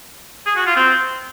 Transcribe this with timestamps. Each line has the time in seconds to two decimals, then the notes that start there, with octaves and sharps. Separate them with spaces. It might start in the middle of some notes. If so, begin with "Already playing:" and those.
0.46 G#4
0.56 F#4
0.66 F4
0.76 C4